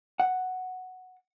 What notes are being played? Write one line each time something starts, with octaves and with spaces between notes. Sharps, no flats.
F#5